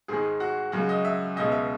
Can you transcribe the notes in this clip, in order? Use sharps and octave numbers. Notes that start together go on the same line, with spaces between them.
G#2 D#3 G#3 G#4
F#4
F#2 C#3 G#3 F#4
D#5
E5
C#2 B2 G#3 D#5
E5